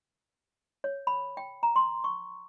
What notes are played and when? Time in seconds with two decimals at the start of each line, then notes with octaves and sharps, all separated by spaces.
0.84 C#5
1.07 B5
1.37 G5
1.63 A#5
1.76 C6
2.04 C#6